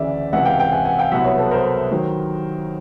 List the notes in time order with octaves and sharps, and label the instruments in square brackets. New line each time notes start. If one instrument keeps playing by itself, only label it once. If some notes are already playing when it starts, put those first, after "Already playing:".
Already playing: [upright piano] D2 C#3 E3 D5 E5
C#2 C3 E3 E5 F#5
F5 G5
F5 G5
F#5 G#5
F#5 G#5
F5 G5
C2 B2 F#3 E5 F#5
B4 C#5
A4 B4
A#4 C5
D#3 F#3